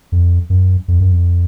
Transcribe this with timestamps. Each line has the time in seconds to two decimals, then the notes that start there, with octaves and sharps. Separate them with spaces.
0.12 F2
0.50 F#2
0.88 F2
1.00 F#2
1.12 F2